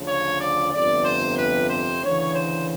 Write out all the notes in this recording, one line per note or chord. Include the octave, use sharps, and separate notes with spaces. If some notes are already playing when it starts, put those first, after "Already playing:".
Already playing: D2 C#3 F3
C#5
D5
G1 F2 C3 D5
C5
B4
C5
D2 C#3 E3 C#5
C5